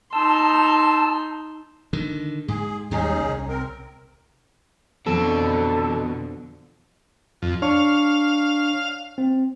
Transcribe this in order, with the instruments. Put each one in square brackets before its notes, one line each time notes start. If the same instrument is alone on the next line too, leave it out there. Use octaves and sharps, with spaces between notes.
[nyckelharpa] D#4 C6 [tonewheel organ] A5 E6
[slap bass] D3 D#3
[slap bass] G#2 [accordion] G#4
[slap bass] D#2 G3 G#3 [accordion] C#4 D#4 G#4
[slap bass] C2
[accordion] C4 A#4
[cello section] F2 D3 [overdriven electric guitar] B2 [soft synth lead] E3 [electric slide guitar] A4
[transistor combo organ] F2
[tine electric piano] D4 C#5 C#6 [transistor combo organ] F5
[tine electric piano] C4